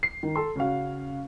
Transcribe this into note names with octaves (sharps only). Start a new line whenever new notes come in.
C7
D#3
A4 C6
C#3 C#4 F#4 F5